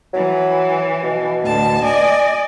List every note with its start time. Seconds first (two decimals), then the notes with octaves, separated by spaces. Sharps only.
0.13 E3 F#3
1.04 B2
1.44 D2 A2 A5
1.83 D5 D#5 G#5